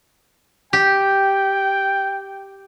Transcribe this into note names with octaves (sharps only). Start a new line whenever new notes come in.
G4 G5